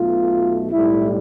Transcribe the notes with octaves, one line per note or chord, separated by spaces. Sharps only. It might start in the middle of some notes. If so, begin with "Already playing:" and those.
Already playing: B1 B2 A3 F4
B1 A2 G3 E4